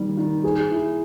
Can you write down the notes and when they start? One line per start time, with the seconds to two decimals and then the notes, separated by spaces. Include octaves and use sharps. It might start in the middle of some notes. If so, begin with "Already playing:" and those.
Already playing: D#3 G3
0.17 D#3
0.44 G#4
0.71 E4